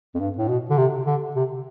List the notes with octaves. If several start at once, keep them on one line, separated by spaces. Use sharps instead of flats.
F2
G2
A2
B2
D3
C3
D3
C3